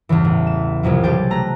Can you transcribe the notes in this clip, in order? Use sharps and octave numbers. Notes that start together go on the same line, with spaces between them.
E2 G2 C#3 E3
A1
E7
C2 F2 C3 F#3
B1 C3 G4 G#4 G5 A6
A3 A#5 F#6